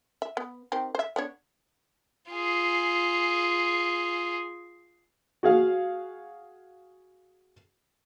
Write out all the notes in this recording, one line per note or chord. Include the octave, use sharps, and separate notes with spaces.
E5
B3
D#3 C4 G4
C5 E5
B3 D4 C#5
F4 G#4
F#4 G#4 F5